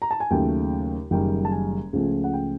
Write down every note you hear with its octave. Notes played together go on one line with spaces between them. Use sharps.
A#5
A5
G#5
D#2 C#3 F#3 A3 G5
F#1 F#2 D#3 G3 G5
A5
G#5
C#2 C#3 F3 A3
F#5
G5